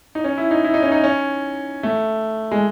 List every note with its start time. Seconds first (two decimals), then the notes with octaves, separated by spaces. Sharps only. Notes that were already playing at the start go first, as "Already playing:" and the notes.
0.15 D#4
0.24 C#4
0.38 E4
0.51 D#4
0.64 E4
0.74 D#4
0.82 C#4
0.92 D#4
1.04 C#4
1.83 A3
2.51 G#3